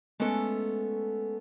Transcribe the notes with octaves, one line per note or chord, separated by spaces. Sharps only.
G#3 A3 B3 C#4 A4